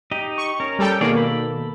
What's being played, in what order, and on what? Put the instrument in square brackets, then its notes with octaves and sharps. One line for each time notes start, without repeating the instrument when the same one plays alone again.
[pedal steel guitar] D#4 G4 D#5
[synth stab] C#6
[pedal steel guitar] C#4 A#4
[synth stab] G3 A4 G5
[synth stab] B2 D#3 A#3 [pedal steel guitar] G#4 C#5 D5
[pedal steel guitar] A4 B5